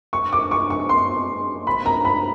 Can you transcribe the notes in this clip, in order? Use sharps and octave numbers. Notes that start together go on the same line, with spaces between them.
C#6
D6
C#6
C#6
C6
B5
A#5
B5